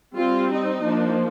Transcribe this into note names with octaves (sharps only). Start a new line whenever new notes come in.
G3 C4 F4
D#4
F3 A#3 D4